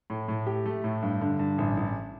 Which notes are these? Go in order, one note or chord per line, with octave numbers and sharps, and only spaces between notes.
A2
A2
G4
A3
A2
G2
D3
G2
A1
A1